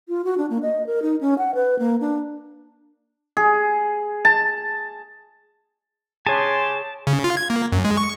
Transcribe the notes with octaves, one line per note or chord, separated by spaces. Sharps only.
F4
F#4
D4
A#3
D#5
A#4
D#4
C#4
F#5
B4
A#3
D4
G#4
A5
G#3 G4 G#4 C#5 G#5 A5 C6
C#3
F4
G#6
A#3
F#2
G#3
C#6